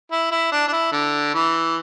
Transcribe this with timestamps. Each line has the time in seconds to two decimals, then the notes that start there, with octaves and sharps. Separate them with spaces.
0.12 E4
0.31 E4
0.52 D4
0.68 D4
0.73 E4
0.92 D3
1.34 E3